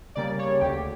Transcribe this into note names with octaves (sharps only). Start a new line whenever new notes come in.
C#3 G3 A#3 D5
C#5
D2 G4